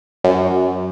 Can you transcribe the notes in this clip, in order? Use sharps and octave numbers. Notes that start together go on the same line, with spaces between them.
F#2